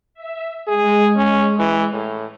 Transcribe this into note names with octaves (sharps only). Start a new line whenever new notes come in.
E5
G#3 G#4
C#4
E3
A2